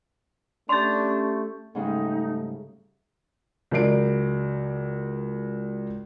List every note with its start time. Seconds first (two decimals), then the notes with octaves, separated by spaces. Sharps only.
0.69 A3 C#4 D4 G4 C6 A6
1.75 G#2 C#3 G3 A3 D#4
3.71 C#2 F#3 A#4 D5 C7 D7